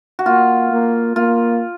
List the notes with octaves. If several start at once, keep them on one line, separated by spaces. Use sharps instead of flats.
F#4
A#3 F4
A#3
A#3 F4